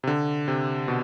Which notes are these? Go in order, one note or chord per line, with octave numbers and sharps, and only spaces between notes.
C3
D3
C3
B2